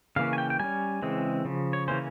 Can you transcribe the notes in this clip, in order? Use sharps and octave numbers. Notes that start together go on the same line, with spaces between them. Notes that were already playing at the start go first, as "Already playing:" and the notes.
C#3 E3 A#3 C#4 F5
G#5
G5
G5
G3 C#4 G#5
C#3 E3 G#3 C4
C#3 F3
C#5
C#3 E3 A#3 C#4 C5